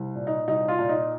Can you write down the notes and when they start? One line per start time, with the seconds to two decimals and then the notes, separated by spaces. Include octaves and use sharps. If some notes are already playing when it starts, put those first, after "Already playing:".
Already playing: C2
0.16 A#2
0.27 D#4
0.47 C2 D#4
0.68 F4
0.79 A#2
0.89 D#4